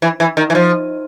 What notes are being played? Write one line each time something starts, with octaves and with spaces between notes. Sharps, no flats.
E3
E3
D#3
E3
F3